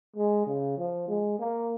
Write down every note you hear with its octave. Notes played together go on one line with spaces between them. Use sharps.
G#3
C#3
F3
G#3
A#3